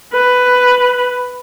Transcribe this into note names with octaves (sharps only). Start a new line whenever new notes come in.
B4